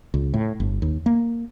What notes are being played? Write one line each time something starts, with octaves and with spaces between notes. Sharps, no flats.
C#2
A2
G1
D#2
A#3